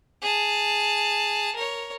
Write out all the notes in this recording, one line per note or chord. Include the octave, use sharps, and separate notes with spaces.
G#4 A5
A#4 C#5